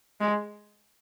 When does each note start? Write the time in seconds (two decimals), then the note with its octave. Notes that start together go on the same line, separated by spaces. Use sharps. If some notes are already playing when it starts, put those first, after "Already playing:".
0.21 G#3